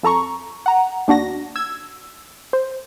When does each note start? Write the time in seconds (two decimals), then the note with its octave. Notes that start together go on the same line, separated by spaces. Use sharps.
0.03 F2 A4 A#5 C#6
0.66 F#5 A#5
1.08 D#2 D4 F#4 A#6
1.56 E6 G#6
2.53 C5